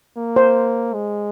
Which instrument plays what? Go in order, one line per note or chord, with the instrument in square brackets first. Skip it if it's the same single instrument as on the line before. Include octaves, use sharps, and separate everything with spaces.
[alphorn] A#3
[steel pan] C5
[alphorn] G#3